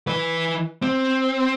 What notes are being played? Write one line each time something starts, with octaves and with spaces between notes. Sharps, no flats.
E3 B4
C4